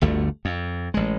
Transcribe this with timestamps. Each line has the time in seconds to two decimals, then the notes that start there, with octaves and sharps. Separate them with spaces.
0.01 G1 D2 D3 A3
0.45 F2
0.94 A1 G#3